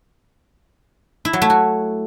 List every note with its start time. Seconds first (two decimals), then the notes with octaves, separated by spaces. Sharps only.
1.25 E4
1.33 F#3
1.42 A3
1.50 F#4